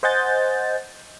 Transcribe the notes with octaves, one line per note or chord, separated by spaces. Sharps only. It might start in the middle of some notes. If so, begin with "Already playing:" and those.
C5 D#5 F#5 G#5 G6 A6